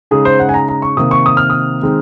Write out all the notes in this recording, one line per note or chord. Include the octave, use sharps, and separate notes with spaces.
C#3 G#3 D#4 G#4
C5
F#5
G#5
A#5
A#5
C#6
C3 D#3 A#3 D#6
C#6
D#6
F6
D#6
D#3 G#3 C4 D#4